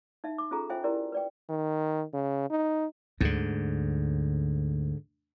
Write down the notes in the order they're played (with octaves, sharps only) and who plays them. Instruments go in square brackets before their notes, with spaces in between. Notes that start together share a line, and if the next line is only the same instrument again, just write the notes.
[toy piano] D#4 E5
D6
C#4 F4 G#4 A4 A#5
F4 C5 E5 G5 G#5
E4 G4 A#4 D5
B4 D5 G5
[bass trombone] D#3
C#3
D#4
[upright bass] D2 [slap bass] G#2 D3